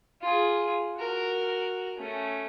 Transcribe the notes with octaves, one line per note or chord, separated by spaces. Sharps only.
F4 G#4
F#4 A#4
A3 C#4